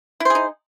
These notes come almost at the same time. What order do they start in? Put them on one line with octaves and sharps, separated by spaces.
E4 C5 G#4 D#4